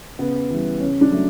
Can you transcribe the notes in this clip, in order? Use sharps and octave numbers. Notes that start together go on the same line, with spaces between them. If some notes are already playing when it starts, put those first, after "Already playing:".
C#3 B3
E3 G3
C#3 C#4
D4
F#3 A3